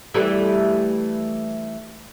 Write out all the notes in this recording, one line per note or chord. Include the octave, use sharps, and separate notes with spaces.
E3 G3 A3